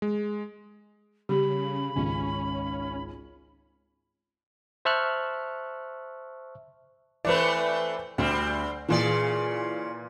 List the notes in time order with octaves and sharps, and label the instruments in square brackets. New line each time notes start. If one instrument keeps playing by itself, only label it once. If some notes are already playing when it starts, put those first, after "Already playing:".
[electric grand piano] G#3
[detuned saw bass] C#3 [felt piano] G3 [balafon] G4 [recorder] B5
[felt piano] G#1 C#2 [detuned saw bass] C#4
[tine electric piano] C5 E5 A5 C#6 F6 F#6
[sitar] E3 A3 C4 [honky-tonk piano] B4 C5 D5
[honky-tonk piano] D2 [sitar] G3 C4
[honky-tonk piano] A#2 E3 [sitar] C#3 G#4 D5